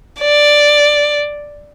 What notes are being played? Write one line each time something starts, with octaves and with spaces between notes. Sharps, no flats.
D5